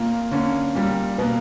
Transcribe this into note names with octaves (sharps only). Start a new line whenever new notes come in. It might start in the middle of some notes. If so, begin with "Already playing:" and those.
Already playing: A#2 A#3
D3 A#3 C#4
A#2 G3 A#3
B2 A#3 B3